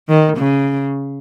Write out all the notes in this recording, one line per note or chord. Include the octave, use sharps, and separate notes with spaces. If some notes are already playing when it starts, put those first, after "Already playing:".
D#3
C#3